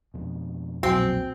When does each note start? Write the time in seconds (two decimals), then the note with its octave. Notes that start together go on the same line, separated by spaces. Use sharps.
0.14 F2 B2
0.83 B1 F2 A#2 C4 F#4 G#5